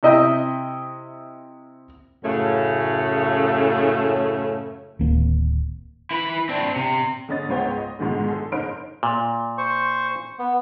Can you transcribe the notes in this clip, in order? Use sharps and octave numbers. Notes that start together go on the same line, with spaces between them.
C3 E4 D#5 E5 G5
F#2 A2 C#3 A3 C#4
D1 D#3 A#3 C4
E4 B4
C4 D4
C3
D3 C#4 D#5 A6
C#2 G#2 B3 C5 C#5 G5
D#5
G#2 B2 D3 D#3 F3 G#3
G#4 A4
F#1 D#4 C5 F6 D7
A#2
C5 C#6
B3